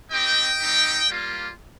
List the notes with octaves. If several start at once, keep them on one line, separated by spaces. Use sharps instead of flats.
C4 D#4 G4 D#5 G5
G3 C4 D#4 G4
G3 A#3 F4